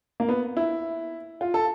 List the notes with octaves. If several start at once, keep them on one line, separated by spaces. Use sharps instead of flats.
A#3
B3
E4
F4
A4